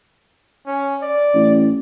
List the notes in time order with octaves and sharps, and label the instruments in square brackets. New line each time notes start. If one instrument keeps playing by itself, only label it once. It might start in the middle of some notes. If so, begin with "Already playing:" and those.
[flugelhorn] C#4
D5
[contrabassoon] A1